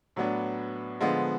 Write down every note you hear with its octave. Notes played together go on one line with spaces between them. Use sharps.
A2 F#3 B3 D4
D3 F3 G#3 B3